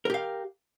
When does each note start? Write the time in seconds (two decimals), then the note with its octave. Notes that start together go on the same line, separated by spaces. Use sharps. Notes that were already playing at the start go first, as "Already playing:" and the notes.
0.05 A#4
0.10 G4
0.14 F5